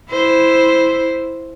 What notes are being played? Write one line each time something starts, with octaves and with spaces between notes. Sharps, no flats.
E4 C5